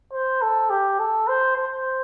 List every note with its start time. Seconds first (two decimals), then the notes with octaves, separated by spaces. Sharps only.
0.13 C5
0.42 A4
0.70 G4
0.99 A4
1.28 C5
1.57 C5